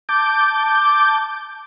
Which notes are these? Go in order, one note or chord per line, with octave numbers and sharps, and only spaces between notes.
A5 D6 G6